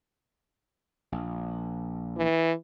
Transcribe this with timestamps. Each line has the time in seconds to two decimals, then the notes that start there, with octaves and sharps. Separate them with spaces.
1.12 A#1
2.17 E3